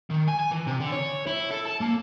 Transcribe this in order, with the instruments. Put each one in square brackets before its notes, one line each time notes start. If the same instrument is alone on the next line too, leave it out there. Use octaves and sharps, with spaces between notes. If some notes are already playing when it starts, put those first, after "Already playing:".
[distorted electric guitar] D#3
G#5
G#5
E3
C3
D3
C#5
E4
A4
A5
A#3